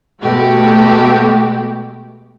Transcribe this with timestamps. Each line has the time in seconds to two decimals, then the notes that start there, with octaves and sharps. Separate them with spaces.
0.23 B2 G#3 A3 F#4 G4